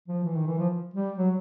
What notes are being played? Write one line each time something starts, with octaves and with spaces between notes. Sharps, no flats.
F3
E3
D#3
E3
F3
G3
F#3